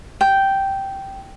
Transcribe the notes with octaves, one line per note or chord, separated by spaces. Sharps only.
G5